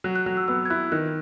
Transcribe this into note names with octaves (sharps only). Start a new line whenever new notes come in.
F#3 F#6
F#6
F#3 F#6
E6
B3 E6
G#6
E4 F#6
D#3 F#6